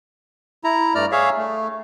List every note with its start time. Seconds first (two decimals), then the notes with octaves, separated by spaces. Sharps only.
0.64 E4 A#5
0.95 G2 A3 D5 A#5 F6
1.11 G#4 C#5 E5 F5
1.37 A3